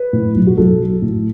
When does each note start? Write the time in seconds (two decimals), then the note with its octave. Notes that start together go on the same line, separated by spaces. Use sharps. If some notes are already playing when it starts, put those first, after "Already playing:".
Already playing: B4
0.13 A2
0.35 B1
0.47 F#4
0.57 B1 A4
0.80 F#3
1.02 A2